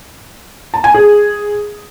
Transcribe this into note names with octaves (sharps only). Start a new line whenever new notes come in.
A5
G#5
G#4